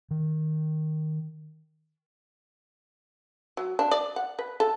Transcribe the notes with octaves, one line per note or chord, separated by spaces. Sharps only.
D#3
F#3
D4
D5
F#5
B4
A4